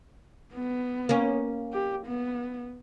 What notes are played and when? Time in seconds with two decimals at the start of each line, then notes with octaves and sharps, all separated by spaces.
0.54 B3
1.09 A#3 C#4
1.73 G4
2.06 B3